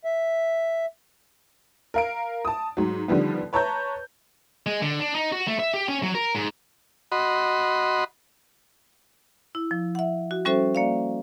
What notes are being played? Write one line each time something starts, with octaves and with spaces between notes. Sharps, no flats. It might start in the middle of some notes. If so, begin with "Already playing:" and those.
E5
A#4 F5 D7
A5 D#6
G#2 F#3
D3 D#3 F3 G3 B3
B4 C#5 A5 A#5 G6
G#3
D3
D4
D#4
F#4
A3
E5
G4
C#4
F#3
A#4
G#2
F#4 D#5 B5 C6
E4
F3
E5 F#5
F#4
G3 C#4 F#4 A4 C5 E5
A#3 D5 F5